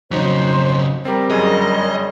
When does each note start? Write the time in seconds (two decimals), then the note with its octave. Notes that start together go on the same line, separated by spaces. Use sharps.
0.11 F2 C#3 F#3 D#4 C5
1.05 G3 C4 G4 A#4
1.31 G1 F#2 G#4 D#5